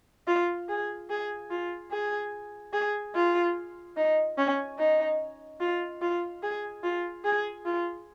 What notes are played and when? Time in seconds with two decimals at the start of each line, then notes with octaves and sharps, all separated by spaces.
0.27 F4
0.69 G#4
1.10 G#4
1.50 F4
1.91 G#4
2.73 G#4
3.15 F4
3.96 D#4
4.38 C#4
4.78 D#4
5.60 F4
6.01 F4
6.43 G#4
6.83 F4
7.25 G#4
7.65 F4